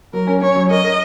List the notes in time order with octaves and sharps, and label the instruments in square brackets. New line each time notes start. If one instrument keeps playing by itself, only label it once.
[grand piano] F#3 [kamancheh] A#4
[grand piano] C#4
[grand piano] C#4 [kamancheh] C#5
[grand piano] F#3
[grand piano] A#4 [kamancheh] D#5
[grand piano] A#4